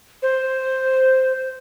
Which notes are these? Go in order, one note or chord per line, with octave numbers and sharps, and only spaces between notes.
C5